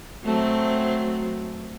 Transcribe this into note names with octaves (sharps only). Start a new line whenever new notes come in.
F#3 A3 C4